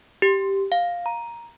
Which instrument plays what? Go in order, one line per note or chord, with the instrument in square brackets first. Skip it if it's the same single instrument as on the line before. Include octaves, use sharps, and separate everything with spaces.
[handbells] G4
F5
A#5